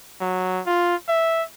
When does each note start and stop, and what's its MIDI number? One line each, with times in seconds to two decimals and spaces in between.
0.20 0.61 54
0.66 0.95 65
1.08 1.43 76